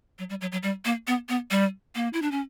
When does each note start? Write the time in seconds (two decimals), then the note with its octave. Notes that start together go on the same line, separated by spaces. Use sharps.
0.19 F#3
0.30 G3
0.41 F#3
0.52 F#3
0.63 G3
0.85 A#3
1.07 B3
1.29 B3
1.51 G3
1.95 A#3
2.13 E4
2.22 D4
2.32 C#4